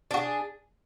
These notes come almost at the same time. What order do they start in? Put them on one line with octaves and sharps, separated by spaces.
D4 F#4 G#4